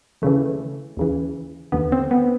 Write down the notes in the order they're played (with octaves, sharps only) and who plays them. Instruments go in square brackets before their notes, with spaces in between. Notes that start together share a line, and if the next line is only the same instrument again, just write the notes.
[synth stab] D#2 C#3 E3 A3
D#2 C#3 E3
D#2 D3 B3
C4
B3